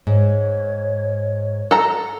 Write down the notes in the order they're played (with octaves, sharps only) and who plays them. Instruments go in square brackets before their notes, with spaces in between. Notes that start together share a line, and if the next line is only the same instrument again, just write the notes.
[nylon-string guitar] G#2 [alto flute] C#5
[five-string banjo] A4 A#5